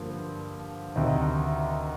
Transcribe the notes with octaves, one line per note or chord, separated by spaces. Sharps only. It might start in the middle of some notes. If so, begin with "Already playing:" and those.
Already playing: G2 D3 F3 A#3
D2 C3 D#3